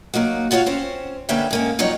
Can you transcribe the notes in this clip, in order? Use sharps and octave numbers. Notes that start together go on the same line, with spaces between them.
F#3 A#3 D#4 F#4
F4 F#4 C#5 D5 F5
C4 C#4 C5
D3 A#3 C#4 B4 E5 G5
G#2 A#3 C#4
F2 F#3 G3 D#4 C#5